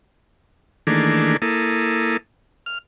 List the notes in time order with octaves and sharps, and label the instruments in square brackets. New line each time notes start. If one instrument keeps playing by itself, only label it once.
[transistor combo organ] D#3 E3 A3 A#3 D4 G#4
A#3 E4 A4 D#6
F6